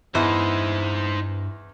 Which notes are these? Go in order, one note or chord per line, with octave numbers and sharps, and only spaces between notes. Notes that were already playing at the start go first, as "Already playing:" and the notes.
E2 G2 D#4 E4 C5 D#5 F#5